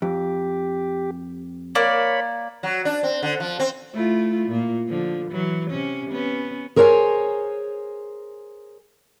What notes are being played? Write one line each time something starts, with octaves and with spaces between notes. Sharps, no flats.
F2 G4
A#3 C#5 D5 B5
F#3
D4
C4
D3
F3
C4
A3 E4 F4
A#2 A#3
D3 F3
E3 F#3
C3 C#4
B3 C#4
G#4 A#4 C5 C#5 F#5 G#5